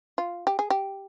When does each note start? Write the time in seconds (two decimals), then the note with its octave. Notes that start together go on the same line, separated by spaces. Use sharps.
0.18 F4
0.47 G4
0.59 G#4
0.70 G4